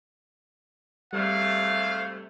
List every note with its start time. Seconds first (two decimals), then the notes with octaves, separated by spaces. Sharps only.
1.13 G#2 C3 G3 A3 F5